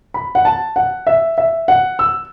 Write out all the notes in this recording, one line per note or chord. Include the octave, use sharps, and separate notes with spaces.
B5
F#5
A5
F#5
E5
E5
F#5
E6